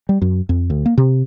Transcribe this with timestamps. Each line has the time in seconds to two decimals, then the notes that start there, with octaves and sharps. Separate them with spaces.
0.09 G3
0.22 F#2
0.49 F2
0.70 D2
0.86 A#3
0.98 C3